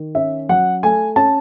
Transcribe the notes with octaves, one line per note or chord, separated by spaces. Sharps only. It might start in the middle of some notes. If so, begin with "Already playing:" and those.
Already playing: D#3
C#4 E5
F#3 F#5
A3 G#5
C#4 A5